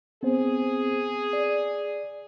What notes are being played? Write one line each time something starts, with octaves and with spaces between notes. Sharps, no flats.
B3 C4 G#4 C5
D5